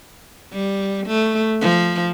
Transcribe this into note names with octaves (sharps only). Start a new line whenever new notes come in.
G3
A3
F3